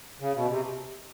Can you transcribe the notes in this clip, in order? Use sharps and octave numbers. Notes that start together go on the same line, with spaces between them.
C#3
B2
C3